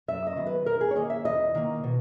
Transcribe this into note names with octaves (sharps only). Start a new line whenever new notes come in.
F#2 E5
D#5
D#3 F#3 B3
B4
E2 A#4
G#4
C#5
D#3 A#3 D#5
E5
E2 D#5
D#3 A#3
B2